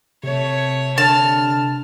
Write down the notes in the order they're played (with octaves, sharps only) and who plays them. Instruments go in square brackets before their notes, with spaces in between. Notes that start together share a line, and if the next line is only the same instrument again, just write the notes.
[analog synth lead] C3 [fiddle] A3 C#5
[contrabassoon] D3 [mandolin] A5 [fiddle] F6